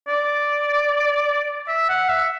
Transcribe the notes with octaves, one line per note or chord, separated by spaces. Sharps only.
D5
E5
F#5
E5